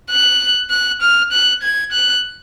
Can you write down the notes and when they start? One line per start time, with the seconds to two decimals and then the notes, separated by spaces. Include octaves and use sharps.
0.10 F#6
0.70 F#6
1.01 F6
1.32 F#6
1.62 G#6
1.92 F#6